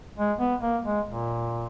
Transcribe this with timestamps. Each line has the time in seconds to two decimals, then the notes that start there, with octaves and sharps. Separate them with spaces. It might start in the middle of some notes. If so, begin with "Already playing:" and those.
0.18 G#3
0.40 B3
0.62 A#3
0.85 G#3
1.07 A#2